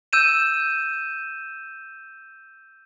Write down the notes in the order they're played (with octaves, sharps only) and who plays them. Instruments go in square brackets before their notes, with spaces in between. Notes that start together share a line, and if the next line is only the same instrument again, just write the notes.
[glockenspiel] E6 G6 D#7 E7